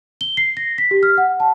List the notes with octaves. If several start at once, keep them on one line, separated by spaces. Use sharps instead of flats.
G7
C7
A#6
B6
G4
F6
F#5
A5